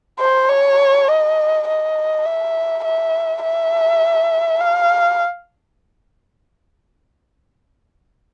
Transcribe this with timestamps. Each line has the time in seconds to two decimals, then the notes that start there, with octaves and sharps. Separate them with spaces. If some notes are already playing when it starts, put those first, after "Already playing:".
0.20 C5
0.49 C#5
1.08 D#5
1.67 D#5
2.26 E5
2.85 E5
3.44 E5
4.61 F5